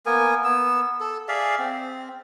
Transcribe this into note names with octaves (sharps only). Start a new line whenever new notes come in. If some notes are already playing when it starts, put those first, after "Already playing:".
A#3 B3 A#4 G#5
B3 E6
A4
G#4 D5 E5 F5
C4